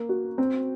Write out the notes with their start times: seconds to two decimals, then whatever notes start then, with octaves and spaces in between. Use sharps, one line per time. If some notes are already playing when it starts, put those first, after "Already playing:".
Already playing: A#3
0.09 F#4
0.38 C4